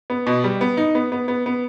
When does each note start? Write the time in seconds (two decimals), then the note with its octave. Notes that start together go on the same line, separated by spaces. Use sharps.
0.10 B3
0.27 B2
0.44 G3
0.61 B3
0.77 D#4
0.95 B3
1.12 B3
1.28 B3
1.46 B3